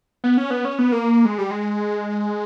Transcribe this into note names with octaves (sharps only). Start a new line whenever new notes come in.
B3
C#4
B3
C#4
B3
A#3
G#3
G3
G#3